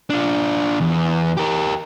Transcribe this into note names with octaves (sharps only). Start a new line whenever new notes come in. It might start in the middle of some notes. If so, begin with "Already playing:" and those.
D4 F4
E2
G4 A#4